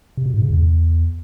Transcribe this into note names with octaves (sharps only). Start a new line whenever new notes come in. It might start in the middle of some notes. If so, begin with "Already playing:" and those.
C3
B2
G#2
C#3
E2